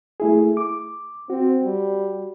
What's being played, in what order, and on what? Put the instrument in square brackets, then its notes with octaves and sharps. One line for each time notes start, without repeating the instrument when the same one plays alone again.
[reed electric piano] A3 E4 G#4
D6
[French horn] C4 [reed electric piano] F#4
[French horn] G3